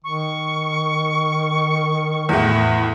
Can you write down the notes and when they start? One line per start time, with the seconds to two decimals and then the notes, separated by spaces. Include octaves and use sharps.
0.04 D#3 C#6
2.29 E2 A2